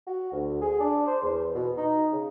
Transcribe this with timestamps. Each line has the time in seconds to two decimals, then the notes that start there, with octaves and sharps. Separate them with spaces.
0.07 F#4
0.32 D2
0.62 G#4
0.80 D4
1.07 C5
1.22 E2
1.55 B2
1.77 D#4
2.12 C#3